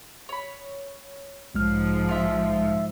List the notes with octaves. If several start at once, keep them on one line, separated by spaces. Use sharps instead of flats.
C#5 B5
B1 G#2 F3 G#3 F6
F4 E5